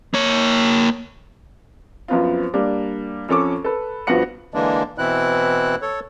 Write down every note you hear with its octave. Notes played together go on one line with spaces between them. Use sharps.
A#3 C#5
F#2 F3 B3 C4 F4
G3 A#3 D4
F2 C#4 A4 C#6 D6
A4 B4
G2 F3 B3 F#4 F#5 C#7
D3 E3 G#3 A#3 D4
B2 E3 C4 E4 F#6
A4 C#5